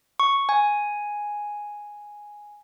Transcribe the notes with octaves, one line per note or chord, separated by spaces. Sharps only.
C#6
G#5